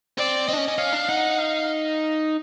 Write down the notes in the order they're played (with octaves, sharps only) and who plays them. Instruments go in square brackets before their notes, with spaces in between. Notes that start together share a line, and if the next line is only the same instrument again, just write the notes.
[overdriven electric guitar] C4 [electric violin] D5
[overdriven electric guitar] C4 [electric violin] D#5
[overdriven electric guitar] D4
C#4
C#4
[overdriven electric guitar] C#4 [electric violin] F5
[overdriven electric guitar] D4
[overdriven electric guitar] D#4 [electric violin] F#5
[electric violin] F5